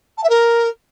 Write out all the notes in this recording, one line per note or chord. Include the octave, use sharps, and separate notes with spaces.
A5
E5
A#4